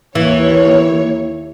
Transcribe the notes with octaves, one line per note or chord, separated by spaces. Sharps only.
D#2 E3 C#5